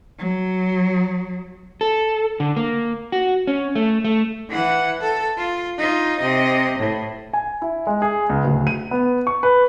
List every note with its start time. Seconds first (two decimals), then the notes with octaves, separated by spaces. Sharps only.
0.19 F#3
1.81 A4
2.40 D3
2.56 A#3
3.12 F#4
3.47 C#4
3.75 A3
4.04 A3
4.49 E3 F#5
5.01 A4
5.37 F4
5.78 D#4 F4
6.19 C3 D#5
6.79 A2
7.33 G#5
7.62 E4
7.87 G#3
8.02 G#4
8.29 C#2
8.44 D1
8.67 D#7
8.91 B3
9.27 C#6
9.43 B4